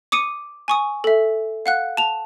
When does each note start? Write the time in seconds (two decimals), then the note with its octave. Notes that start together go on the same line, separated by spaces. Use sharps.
0.12 D6 D#6 C#7 D#7
0.68 G#5 C#6 D#6
1.04 A4 E5
1.66 F5 F#5 F#6
1.97 A5 F7